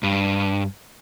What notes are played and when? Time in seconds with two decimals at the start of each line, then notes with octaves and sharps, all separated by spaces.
0.03 G2